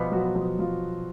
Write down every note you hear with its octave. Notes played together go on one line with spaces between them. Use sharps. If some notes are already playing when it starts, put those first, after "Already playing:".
Already playing: B2 F3 G3 B3 F4
F#3 F#4
F3 F4
F3 F4